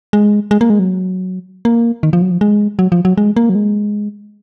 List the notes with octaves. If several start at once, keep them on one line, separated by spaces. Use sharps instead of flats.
G#3
G#3
A#3
G#3
F#3
A#3
D#3
F3
F#3
F3
G#3
F#3
F3
F#3
G#3
A#3
F#3
G#3